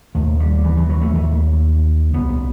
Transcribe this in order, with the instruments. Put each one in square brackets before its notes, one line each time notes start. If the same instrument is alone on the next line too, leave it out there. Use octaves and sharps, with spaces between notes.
[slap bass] D#2 A3
G3
E3
E3
F#3
A3
D#2
C2 C3 B3